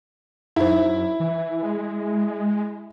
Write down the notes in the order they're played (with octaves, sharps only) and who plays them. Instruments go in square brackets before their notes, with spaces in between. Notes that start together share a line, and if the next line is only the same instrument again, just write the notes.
[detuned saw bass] F#2 [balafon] D#4 C5 [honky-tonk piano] E4
[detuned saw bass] E3
G#3